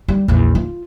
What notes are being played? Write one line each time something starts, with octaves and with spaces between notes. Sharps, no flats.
G3
A#1 E2
F4